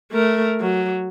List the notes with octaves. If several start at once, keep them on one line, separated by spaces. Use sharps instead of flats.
A3 A#4
F#3